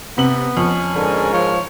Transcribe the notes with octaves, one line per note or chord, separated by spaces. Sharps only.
C3 B3 F#7
F2 C#4
G#2 D3 G#4 A#4
F3 C#5